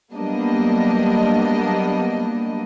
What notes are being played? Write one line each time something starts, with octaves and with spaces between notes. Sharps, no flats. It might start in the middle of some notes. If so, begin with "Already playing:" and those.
F#3 G3 A#3 B3 D4 D#5